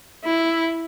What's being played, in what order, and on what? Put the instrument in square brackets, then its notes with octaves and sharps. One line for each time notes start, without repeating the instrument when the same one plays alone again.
[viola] E4